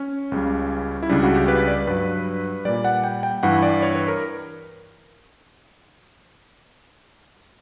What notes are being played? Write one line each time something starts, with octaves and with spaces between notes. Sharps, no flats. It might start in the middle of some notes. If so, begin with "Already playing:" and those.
Already playing: C#4
C#2 C#3 G3
E4
C#2 C#3 G3 D4
F#4
G4
B4
D5
G2 F#3 B4
A#2 G3 D5
F#5
G5
G5
G2 E3 G3 F#5
D5
C#5
B4
A#4